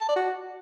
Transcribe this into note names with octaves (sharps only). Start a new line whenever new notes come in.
A5
D5
F#4